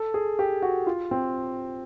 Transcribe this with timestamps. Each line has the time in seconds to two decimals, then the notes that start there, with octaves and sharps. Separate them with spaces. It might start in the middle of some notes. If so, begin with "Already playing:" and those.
Already playing: A4
0.14 G#4
0.39 G4
0.62 F#4
0.87 F4
1.11 C4